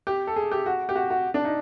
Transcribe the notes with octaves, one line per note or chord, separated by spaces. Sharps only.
G4
A4
G#4
G4
F#4
G4
F#4
F#4
D4
D#4